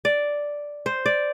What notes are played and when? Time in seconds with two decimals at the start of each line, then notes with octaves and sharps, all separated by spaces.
0.05 D5
0.86 C5
1.06 D5